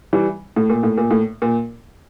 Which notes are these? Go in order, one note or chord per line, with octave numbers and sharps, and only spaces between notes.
E3 G3
A2
A#2
A2
A#2
A2
A#2